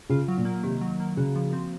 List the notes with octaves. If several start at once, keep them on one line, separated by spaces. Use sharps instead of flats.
C#3 F4
F#3
A#2
A#3
C3 D#3
F#3
A#3
C#3 F#4
F3
C4